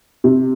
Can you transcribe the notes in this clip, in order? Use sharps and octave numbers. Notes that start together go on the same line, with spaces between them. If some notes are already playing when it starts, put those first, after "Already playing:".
C3